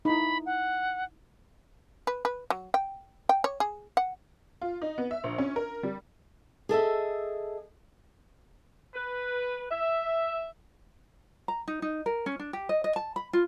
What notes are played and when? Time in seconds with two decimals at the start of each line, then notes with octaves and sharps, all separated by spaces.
0.05 D#4 E4 B5
0.46 F#5
2.07 B4
2.25 B4
2.50 F#3
2.74 G5
3.29 G5
3.44 C#5
3.60 G#4
3.97 F#5
4.62 F4
4.82 D#4
4.98 B3
5.11 E5
5.24 A#1
5.38 C#4
5.56 A#4
5.83 G3
6.69 G#4 A4 D#5 E5
8.94 B4
9.70 E5
11.48 A#5
11.68 D#4
11.82 D#4
12.06 A#4
12.26 C#4
12.39 D4
12.53 G4
12.69 D#5
12.84 D#5
12.96 A5
13.16 B5
13.33 F4